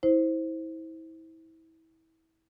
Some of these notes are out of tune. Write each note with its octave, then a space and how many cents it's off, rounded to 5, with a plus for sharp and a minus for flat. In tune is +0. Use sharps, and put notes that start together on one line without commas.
E4 -30 C5 +0